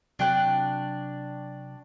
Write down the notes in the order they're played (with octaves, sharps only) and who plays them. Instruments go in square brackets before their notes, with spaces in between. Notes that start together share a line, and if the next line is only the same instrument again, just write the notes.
[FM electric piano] C3 F#3 [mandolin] D4 G5 F#6